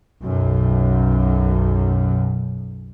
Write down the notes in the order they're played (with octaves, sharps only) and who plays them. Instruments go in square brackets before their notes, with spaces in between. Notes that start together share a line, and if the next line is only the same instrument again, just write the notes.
[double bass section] B1 F#2